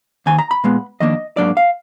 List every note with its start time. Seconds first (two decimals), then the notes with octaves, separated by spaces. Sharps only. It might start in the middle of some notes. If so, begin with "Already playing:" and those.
0.26 D#2 D#3 G#5
0.38 A#5
0.51 B5
0.64 A#2 G#3 B3
1.00 F2 D#3 A#3 D4 D#5
1.37 G#2 F#3 A#3 D4 D5
1.57 F5